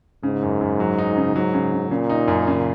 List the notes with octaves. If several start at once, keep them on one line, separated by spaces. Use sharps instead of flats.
G#2 C#3
F#2
F#2
F#3
D#4
C#3
G#2 F#3
C#3
C#3
A#2 C#3
D#4
F#2
C#3